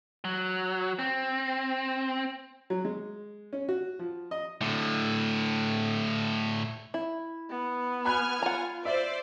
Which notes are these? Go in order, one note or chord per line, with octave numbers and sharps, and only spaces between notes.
F#3
C4
F#3
G#3
C#4
F#4
F3
D#5
A2 D3
E4
B3
G#5 B5 F6 F#6 B6
F4 F#5 A#5
C5 D5 E5